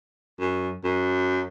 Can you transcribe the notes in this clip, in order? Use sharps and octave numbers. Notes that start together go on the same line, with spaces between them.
F#2
F#2